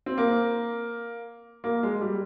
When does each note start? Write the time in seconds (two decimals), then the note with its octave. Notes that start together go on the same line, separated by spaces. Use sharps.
0.06 C4
0.18 A#3
1.64 A#3
1.83 G#3
2.01 G3